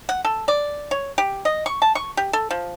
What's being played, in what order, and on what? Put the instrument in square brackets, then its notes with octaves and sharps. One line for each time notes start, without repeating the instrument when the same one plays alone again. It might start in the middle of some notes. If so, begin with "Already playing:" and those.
[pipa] F#5
A4
D5
C#5
G4
D#5
C#6
A5
C#6
G4
A4
F3